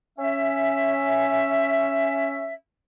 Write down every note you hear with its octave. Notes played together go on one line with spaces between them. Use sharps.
C#4 E5